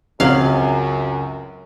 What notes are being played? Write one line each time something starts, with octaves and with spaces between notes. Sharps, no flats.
C#2 F#2 F#3 C4 C#4 F5 F#7